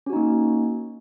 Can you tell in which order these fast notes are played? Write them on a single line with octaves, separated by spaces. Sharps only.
C#4 F#4 D#4 A#3